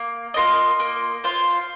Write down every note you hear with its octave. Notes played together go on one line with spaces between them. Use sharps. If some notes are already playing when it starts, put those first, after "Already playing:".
Already playing: A#3
F4 A#4 D#5
A#3
F4 C5 F5